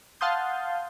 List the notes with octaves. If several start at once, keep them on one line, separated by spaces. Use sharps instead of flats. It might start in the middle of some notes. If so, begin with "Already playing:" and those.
F5 F#5 A5 C6 D#6 G6